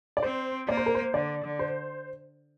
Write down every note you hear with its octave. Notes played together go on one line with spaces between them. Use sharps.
D5
C4 C5
A#3 D5
C5
A#4
C5
D3 D5
D3
C5